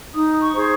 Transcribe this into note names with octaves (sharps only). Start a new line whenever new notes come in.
D#4 D#6
C#6
G#4 C5